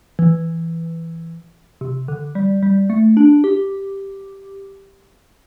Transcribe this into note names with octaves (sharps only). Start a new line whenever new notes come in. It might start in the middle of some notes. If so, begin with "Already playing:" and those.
E3
C3
D3
G3
G3
A3
D4
G4